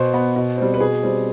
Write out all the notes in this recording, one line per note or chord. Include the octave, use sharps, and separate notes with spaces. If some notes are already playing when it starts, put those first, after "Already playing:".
Already playing: B2 C5
B3
B2
G3 C4
B4
B2 G#4
G3 C4